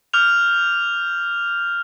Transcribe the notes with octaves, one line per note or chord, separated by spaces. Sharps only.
D6 E6 F6 G6 F7